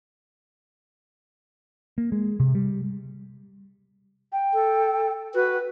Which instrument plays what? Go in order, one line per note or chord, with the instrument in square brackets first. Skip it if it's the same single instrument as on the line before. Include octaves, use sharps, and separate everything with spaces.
[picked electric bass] A#3
G#3
C3
G3
[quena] G5
[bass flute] A4
[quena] F#4 [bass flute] B4